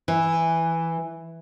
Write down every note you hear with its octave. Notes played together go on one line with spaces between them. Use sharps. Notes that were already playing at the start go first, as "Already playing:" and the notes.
E3